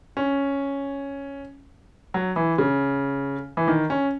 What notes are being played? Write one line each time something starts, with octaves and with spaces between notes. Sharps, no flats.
C#4
F#3
E3
C#3
E3
D#3
C#4